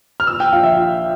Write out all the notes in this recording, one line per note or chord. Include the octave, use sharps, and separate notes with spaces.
F6
A#2 E6
G5
A#1 F5
E5
A#2